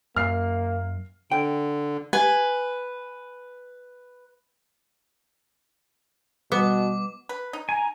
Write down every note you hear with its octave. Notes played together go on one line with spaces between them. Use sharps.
F#2 A#3 F6 C7
D3 G5
B4 G#5
B2 G3 B3 D6
B4
D#4
G#5 A#5